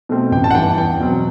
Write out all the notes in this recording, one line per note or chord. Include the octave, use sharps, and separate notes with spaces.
B2 A3 C4
A1 G5
A5
F#5
G2 E3 G3 G5
E2 G5
B2 F#3 C4